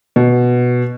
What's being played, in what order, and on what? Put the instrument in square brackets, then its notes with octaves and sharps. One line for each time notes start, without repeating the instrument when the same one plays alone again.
[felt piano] B2